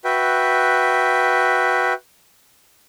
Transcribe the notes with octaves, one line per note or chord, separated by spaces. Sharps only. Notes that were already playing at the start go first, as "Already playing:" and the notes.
F#4 B4 E5 G5